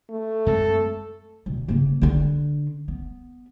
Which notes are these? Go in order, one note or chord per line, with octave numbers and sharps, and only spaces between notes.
A3
F#2 G#3 C4 A4
D2 B2
C#3 A#3
D3 D4
B3